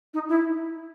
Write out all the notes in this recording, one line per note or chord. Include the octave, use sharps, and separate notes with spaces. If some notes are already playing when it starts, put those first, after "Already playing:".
D#4
E4